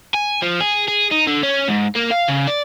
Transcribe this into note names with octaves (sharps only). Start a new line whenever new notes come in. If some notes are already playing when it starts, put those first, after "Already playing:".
G#5
F3
G#4
G#4
D#4
D3
C#4
G#2
A#3
F5
C#3
D5